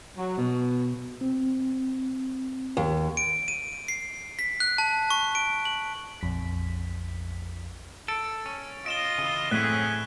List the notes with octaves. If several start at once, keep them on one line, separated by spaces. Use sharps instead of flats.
F#3
B2
C4
D#2
D7
D#7
C7
B6
F#6
A5
C#6
D7
F#7
A#1 F2 B6
A4 A6 D7
C#4
F4 D#5 D7 E7 G7
C#3 E3
F#2 A2 E3 C4 C#4 G#4 F#6 B6